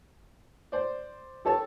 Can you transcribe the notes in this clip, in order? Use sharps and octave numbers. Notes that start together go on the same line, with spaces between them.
C5 D5
G4 A4 C#5 A5